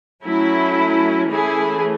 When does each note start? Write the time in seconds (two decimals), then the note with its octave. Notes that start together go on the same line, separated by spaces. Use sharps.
0.24 F#3 A3 C#4 E4
1.31 E3 A3 C#4 E4 G#4